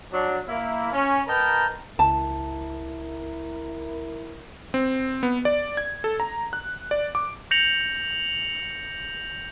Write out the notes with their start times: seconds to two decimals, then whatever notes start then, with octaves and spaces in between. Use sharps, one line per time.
0.12 F#3 D4
0.48 A#3 E4
0.92 C#4
1.27 A#4 B4 D#5 G5 A5 A#5
1.99 C#2 E4 A#4 A5
4.74 C4
5.23 B3
5.45 D5
5.77 G#6
6.04 A4
6.20 A#5
6.53 F#6
6.91 D5
7.15 D6
7.51 G6 A#6 C#7 F7 F#7